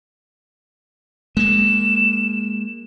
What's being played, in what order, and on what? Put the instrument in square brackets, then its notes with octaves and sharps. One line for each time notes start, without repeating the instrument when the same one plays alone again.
[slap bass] G#3 A#3 [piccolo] E7